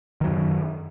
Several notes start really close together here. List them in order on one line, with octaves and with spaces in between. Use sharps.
D#3 F#3 F#2